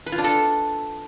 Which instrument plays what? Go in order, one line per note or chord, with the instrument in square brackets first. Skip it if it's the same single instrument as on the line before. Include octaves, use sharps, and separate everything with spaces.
[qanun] B4
F4
D4
A4